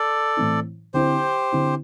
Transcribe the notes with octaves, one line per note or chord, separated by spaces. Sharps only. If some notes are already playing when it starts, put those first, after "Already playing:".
Already playing: A4 D5
A2 E3 C4 E4
D3 C4 E4 G4 C5
D3 C4 E4